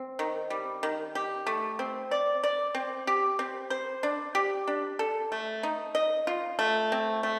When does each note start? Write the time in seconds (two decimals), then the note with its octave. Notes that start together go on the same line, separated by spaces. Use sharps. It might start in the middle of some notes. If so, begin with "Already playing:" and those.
Already playing: C4
0.19 D#3
0.50 G3
0.83 D#3
1.15 G4
1.47 A3
1.79 C4
2.11 D5
2.44 D5
2.75 C4
3.07 G4
3.39 C4
3.70 C5
4.03 D4
4.35 G4
4.68 D4
4.99 A4
5.32 A3
5.63 D#4
5.95 D#5
6.27 F4
6.59 A3
6.92 C4
7.23 A3